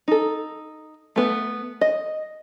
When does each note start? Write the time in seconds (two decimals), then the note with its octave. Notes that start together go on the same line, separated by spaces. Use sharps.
0.08 D#4 A4
1.16 A3 B3 B4
1.81 D#5